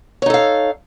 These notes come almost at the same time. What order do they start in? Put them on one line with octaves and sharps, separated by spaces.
C#5 D#4 A4 F5